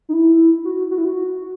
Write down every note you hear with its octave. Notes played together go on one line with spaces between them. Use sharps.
D#4
E4
F#4
F#4
E4
F#4